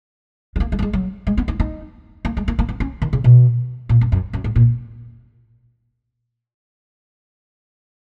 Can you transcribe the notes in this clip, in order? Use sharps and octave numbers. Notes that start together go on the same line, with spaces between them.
G#3
A#3
G#3
A#3
G#3
F#3
G#3
B3
D#4
D#4
A#3
G#3
A#3
A#3
B3
C#4
D#3
C#3
B2
A#2
F#2
F#2
F#2
G#2
A#2